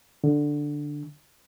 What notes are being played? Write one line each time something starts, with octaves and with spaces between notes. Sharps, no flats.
D3